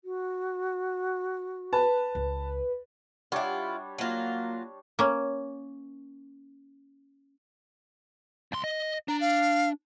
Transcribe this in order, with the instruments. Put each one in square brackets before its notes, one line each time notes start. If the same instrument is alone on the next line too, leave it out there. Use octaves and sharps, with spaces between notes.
[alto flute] F#4
[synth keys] B4 [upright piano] A5
[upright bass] C#2
[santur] G3 D4 C#5 [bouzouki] E4 F4 [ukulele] G4 F#5
[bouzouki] F#3 F4 [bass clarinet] A#3
[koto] A#3 C#4
[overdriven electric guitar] C#2 C6
D#5
[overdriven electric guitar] D4 [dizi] A#5
[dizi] F5